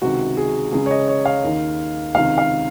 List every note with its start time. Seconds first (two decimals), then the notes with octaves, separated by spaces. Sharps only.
0.02 C#2 C3 D#3 F#4
0.37 G#4
0.72 C#2 C#3 G#4
0.86 C#5
0.91 D#5
1.08 C#5
1.25 F5
1.43 D#2 D#3
2.14 C#2 C3 D#3 F5
2.38 F5